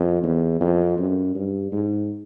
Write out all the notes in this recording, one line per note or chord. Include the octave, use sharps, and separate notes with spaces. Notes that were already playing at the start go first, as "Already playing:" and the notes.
Already playing: F2
E2
F2
F#2
G2
G#2